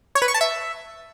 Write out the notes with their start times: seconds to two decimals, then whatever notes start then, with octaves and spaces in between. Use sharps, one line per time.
0.15 C#5
0.22 B4
0.28 C#6
0.34 A5
0.41 E5